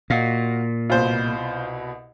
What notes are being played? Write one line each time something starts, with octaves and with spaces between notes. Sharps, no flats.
A#2 F#4 D#5 F5
C2 B2 F4 C5